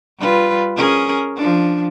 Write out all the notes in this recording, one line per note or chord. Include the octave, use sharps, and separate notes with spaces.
G3 F4 B4
C#4 G#4 A#4
F3 D4